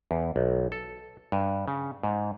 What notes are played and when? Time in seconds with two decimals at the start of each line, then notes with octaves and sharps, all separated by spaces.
0.11 E2
0.36 B1
0.72 A4
1.32 G2
1.68 C#3
2.03 G#2